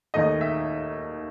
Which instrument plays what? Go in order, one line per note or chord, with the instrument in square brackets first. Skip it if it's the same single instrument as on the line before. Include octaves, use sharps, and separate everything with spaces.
[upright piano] D#2 D#3 A3 D#4 D#5
E5